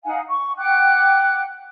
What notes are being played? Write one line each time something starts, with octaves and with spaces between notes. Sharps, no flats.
D#4 F5 F#5 G#5
C#6
F#5 G5 D6 F#6